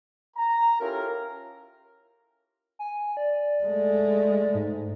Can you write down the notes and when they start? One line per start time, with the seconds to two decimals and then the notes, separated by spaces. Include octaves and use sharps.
0.36 A#5
0.80 C#4 E4 F4 G4 A4 A#4
2.79 G#5
3.17 D5
3.64 G#3 A3
4.54 G#2